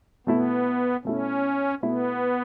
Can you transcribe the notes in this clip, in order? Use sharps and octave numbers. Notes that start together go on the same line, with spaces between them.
B2 A3 B3 E4
B2 A3 C#4 E4
B2 A3 B3 E4